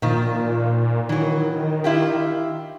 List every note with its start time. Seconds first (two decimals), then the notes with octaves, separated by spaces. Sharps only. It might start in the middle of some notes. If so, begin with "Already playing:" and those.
0.02 A#2 D#3 F3
1.09 D#3 E3 F#3
1.84 E4 F4 G4